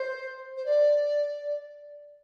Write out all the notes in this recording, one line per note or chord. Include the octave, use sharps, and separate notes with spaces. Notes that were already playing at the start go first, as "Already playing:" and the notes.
Already playing: C5
C5
D5